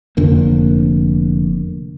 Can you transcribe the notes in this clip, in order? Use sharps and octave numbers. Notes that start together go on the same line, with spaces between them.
F1 F2 D3 A#3